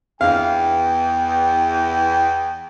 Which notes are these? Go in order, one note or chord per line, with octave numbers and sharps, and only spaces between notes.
E2 F5 G5